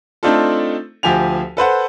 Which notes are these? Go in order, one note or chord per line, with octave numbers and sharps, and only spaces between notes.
A3 C4 D4 D#4 F4 A4
D2 F3 G4 G#5 F7
A4 B4 C5 F#5